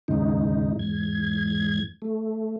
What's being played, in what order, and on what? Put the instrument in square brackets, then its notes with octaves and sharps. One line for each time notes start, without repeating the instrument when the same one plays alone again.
[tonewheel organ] D#2 G#2 C#3 D#4
E2 G#2 G#6
A3